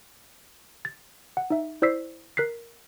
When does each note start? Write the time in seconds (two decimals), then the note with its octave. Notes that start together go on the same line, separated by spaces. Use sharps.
0.85 A6
1.37 F#5
1.50 D#4 E5
1.82 E4 C5 D5 E6 B6 C7
2.37 A#4 F#6 B6 C7